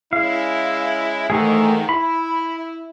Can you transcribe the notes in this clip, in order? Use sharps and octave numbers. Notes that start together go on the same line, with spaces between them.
G#3 C#4 E4 F5
G#2 D#3 E3 A3 G#4
E4 B5